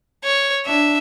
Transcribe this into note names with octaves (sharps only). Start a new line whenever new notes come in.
C#5
D4 E5